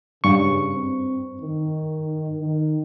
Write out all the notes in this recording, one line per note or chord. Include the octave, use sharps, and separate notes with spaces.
G2 C#3 C#6
C4
D#3
D#3